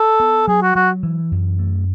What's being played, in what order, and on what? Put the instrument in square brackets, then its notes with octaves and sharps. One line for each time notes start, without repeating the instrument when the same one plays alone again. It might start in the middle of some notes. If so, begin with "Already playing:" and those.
Already playing: [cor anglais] A4
[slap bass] B3
[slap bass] F#3 [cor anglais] G#4
[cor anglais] F#4
[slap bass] F#3 [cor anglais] F#4
[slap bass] E3
F#2
A3